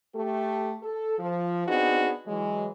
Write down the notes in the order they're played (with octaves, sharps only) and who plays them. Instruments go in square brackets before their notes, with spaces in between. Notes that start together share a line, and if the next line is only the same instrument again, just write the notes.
[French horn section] A3 G4 A4
A4
F3
B3 C4 D4 D#4 F#4 G#4
E3 F#3 G#3